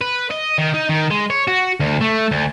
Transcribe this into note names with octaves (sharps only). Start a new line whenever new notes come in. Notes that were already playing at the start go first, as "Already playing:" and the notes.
B4
D#5
D#3
D#4
D#3
G#3
C#5
F#4
D2
A3
D2